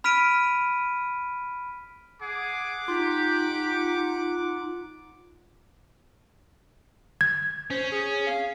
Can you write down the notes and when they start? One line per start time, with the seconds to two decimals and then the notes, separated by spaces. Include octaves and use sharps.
0.04 B5 F6 B6 D7 D#7
2.21 G#4 F#5 D6
2.88 D#4 F4 G4
7.21 G#6
7.70 C#4 C5
7.92 G#4
8.27 F5